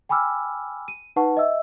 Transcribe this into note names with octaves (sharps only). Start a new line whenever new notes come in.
G5 G#5 B5 D6 E6 F6
D#7
D#4 B4 F#5 A5 C#6
D#5 E5 E6